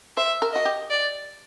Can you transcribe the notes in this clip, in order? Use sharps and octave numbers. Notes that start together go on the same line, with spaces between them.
C5 E5
A#4
F#4 D#5
G4
D5